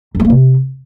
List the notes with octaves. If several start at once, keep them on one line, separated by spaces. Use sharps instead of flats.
F#2
A3
A#3
C3